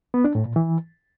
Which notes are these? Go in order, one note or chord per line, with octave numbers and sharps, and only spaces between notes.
B3
D4
A2
A#2
E3